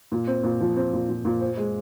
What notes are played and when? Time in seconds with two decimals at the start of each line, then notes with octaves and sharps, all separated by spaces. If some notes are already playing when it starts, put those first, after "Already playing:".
0.12 A#2
0.27 C4
0.43 A#2
0.61 F3
0.76 C4
0.93 A#2
1.09 A#2
1.25 A#2
1.41 C5
1.57 G#3